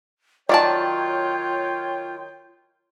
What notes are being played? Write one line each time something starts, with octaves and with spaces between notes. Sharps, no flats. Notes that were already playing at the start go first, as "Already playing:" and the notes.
D#3 F#3 F4 C#5 D5 G5 A5